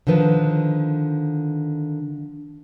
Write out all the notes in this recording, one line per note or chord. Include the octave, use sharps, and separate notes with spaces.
D3 D#3 F3 B4